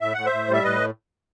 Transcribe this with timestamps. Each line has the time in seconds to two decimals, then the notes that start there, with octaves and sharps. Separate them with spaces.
0.01 A2 E5
0.14 A2 F#5
0.25 C5 E5
0.32 A2
0.48 G3
0.53 E5
0.63 A2 B4 D#5